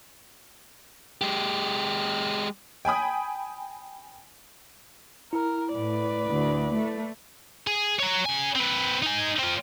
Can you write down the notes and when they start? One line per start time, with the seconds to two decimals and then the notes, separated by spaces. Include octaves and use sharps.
1.21 G#3 G4
2.85 G5 G#5 B5 D#6
5.33 E4 A#4
5.74 A2 B4 D5
6.29 D2
6.76 A3
7.67 G#4
7.99 C#5 A#5
8.25 C#3 G#5
8.56 C4 B4
9.03 D#4 G#5
9.39 C4 F4